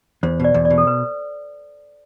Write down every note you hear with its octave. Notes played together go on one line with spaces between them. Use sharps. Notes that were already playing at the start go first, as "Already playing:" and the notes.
E2 C5
B2 D5
E2
D5
B2
A4
B4